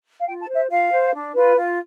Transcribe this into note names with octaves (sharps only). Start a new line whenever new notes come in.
F5
F4 G5
A5
C5
E5
F4 F5
C5
D4
F4 B4
F4